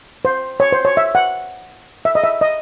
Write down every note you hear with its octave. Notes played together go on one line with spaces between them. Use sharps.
C5
C#5
C5
C#5
E5
F#5
E5
D#5
E5
D#5